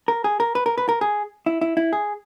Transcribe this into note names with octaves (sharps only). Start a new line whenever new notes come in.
A#4
G#4
A#4
B4
A#4
B4
A#4
G#4
E4
E4
E4
G#4